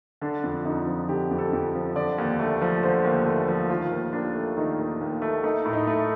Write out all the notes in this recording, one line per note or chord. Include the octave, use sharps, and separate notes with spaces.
D3 D4
F2
F2 D#4
F3
D3 G4
F2
A4
F2
F3
D3 D5
D#2
A3
F3
D3 C5
D#2
A3
F3
D#3 F4
D#2
D#2 D4
A3
D#3 D#4
D#2
D#2
A3
A3 D#4
A2
D#4
A3